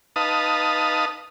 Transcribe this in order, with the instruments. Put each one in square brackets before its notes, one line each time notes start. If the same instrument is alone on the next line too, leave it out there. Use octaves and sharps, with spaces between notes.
[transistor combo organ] D#4 B4 F5 A5 D#6